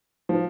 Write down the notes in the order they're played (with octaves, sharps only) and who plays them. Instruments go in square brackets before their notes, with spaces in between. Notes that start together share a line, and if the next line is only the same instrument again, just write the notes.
[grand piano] F3